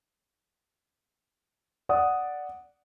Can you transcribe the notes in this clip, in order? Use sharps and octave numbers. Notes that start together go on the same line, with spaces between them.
D5 F#5 D#6